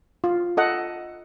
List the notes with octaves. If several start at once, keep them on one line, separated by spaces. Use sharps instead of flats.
F4
A4 D#5 F#5